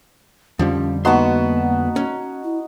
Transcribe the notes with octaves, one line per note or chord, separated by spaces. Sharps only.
F2 D3 F3 G3 C#4
A#3 B3 D#4 F#4 A5 C6
C#4
E4